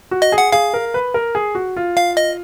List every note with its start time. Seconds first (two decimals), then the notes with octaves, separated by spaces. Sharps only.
0.11 F#4
0.22 D#5
0.32 G#4
0.38 F#5
0.52 G#4 F5
0.74 A#4
0.94 B4
1.14 A#4
1.35 G#4
1.55 F#4
1.77 F4
1.97 F5
2.17 D#5